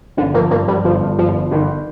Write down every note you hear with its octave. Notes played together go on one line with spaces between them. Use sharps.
G1 D3
F3 A#3
G2 A#3
G2 G3
G1 F3
G2
G1 F3
G1
G1 D#3